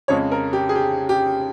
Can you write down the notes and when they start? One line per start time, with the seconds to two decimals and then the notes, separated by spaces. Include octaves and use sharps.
0.08 F2 C#3 G#3 C#5
0.31 A#4
0.53 G4
0.69 G#4
0.75 G4
1.09 G4